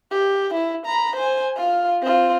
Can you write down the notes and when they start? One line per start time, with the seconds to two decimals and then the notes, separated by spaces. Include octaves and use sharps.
0.10 G4
0.54 E4
0.86 A#5 B5
1.16 C5 G#5
1.56 F4 F5
2.02 C4 F4